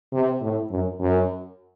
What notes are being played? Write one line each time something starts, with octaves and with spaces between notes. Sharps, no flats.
C3
A2
F#2
F#2